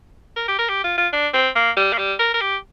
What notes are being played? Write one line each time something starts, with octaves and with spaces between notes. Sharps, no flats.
A#4
G4
A#4
G4
F4
F4
D4
C4
A#3
G3
A#3
G3
A#4
A#4
G4